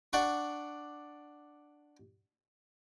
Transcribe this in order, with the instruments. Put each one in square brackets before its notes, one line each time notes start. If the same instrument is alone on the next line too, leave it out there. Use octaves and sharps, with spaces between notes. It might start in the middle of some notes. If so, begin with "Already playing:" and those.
[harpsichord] D4 D5 F#5 C#6